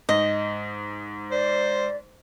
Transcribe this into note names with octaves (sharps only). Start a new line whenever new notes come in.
G#2 D#5
C5 D5